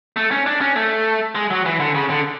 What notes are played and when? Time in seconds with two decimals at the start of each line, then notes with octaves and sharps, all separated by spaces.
0.16 A3
0.31 C#4
0.46 D4
0.61 C#4
0.76 A3
1.35 G#3
1.51 F#3
1.66 E3
1.80 D3
1.95 C#3
2.10 D3